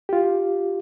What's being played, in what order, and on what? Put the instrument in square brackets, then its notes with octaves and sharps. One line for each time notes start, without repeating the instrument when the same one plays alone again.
[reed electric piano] F4 G4